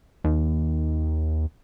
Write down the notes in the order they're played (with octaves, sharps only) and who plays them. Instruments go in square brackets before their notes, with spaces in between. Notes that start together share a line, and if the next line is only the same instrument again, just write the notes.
[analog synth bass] D#2